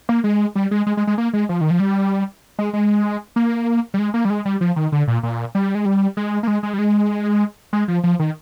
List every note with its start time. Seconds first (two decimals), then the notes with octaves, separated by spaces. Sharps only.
0.09 A#3
0.24 G#3
0.55 G3
0.71 G#3
0.86 G#3
0.97 G#3
1.07 G#3
1.18 A#3
1.33 G#3
1.49 F3
1.61 D#3
1.71 F3
1.80 G3
2.59 G#3
2.73 G#3
3.36 A#3
3.94 G3
3.99 G#3
4.14 A#3
4.25 G3
4.30 G#3
4.45 G3
4.61 F3
4.76 D#3
4.92 D3
5.08 A#2
5.23 A#2
5.55 G3
5.75 G#3
5.85 G3
6.17 G#3
6.43 A#3
6.47 G#3
6.63 G#3
6.74 G3
6.79 G#3
7.73 G#3
7.88 F3
8.04 F3
8.19 D#3